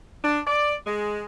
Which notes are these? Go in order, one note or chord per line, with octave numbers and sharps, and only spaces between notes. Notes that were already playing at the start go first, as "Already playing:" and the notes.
D4
D5
G#3